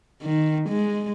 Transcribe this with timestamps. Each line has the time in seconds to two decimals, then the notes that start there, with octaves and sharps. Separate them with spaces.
0.22 D#3
0.69 G#3